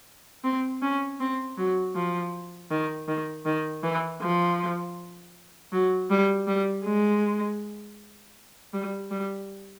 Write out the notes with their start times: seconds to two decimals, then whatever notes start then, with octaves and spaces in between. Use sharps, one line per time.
0.44 C4
0.83 C#4
1.20 C4
1.58 F#3
1.95 F3
2.71 D#3
3.08 D#3
3.46 D#3
3.83 E3
4.22 F3
5.72 F#3
6.10 G3
6.47 G3
6.84 G#3
8.74 G3
9.11 G3